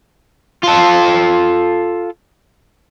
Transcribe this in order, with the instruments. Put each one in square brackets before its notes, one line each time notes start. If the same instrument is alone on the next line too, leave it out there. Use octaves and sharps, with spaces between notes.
[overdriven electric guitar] F4 A4